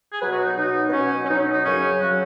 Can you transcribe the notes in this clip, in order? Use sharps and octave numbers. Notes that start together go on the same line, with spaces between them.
G#4
B2 F#3 B4
F#4
D#4
B2 F#3 D#4
B3
B2 F#3 C#4
C#4
B2 F#3 D#4
D#4
F#2 C#3 F#3 C#4
C#3 F#3 F#4